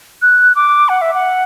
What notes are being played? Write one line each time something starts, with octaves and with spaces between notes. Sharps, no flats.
F#6
D6
F#5
E5
F#5